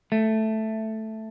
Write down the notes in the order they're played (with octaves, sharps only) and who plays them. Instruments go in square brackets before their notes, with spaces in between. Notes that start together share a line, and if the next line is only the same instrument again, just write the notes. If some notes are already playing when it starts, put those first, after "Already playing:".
[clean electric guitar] A3